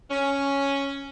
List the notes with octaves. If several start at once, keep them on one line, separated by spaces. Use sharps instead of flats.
C#4